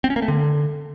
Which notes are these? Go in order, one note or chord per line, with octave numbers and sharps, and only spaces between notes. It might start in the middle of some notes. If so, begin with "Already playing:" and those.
C4
C#4
A#3
A3
D3